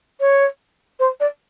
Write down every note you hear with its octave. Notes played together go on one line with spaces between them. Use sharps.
C#5
C5
D5